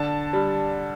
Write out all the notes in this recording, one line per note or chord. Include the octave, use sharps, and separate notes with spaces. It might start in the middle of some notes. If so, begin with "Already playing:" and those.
Already playing: D3 A5
G3